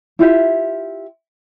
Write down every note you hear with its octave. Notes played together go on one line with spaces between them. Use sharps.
E4 F4 G4 E5